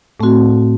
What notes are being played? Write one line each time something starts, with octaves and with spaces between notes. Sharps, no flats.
A2 A3 C4 F#4